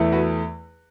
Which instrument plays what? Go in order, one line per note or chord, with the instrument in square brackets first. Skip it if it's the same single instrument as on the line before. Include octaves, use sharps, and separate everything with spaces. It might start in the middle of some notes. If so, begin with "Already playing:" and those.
Already playing: [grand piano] E2 E3 A3
F#4 B4